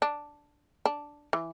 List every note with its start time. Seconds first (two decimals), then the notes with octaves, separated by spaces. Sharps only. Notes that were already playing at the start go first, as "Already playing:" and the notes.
0.02 D4
0.85 D4
1.33 E3